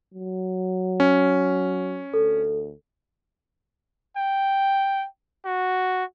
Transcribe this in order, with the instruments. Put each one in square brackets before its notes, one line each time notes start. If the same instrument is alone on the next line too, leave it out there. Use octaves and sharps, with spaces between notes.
[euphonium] F#3
[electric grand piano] C#4
[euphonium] D2 [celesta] A4
[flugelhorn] G5
F#4